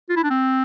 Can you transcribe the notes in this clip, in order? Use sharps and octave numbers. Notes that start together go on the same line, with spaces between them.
F4
E4
D4
C4